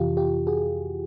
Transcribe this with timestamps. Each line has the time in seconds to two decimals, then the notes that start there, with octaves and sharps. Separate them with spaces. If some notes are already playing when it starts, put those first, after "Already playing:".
Already playing: F2 C3 E3 F4 G4
0.17 F4 G4
0.47 F#4 G#4